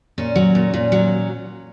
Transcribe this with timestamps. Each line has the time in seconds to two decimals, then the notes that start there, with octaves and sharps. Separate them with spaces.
0.18 A#2 C#4
0.36 F#3
0.55 A#2
0.74 A#2
0.92 F#3